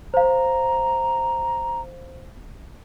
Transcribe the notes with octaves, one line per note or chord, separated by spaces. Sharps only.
C5 F5 A#5